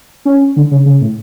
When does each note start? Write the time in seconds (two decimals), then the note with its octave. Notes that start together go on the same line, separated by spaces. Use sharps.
0.25 C#4
0.56 D3
0.71 C#3
0.86 C#3
1.01 A2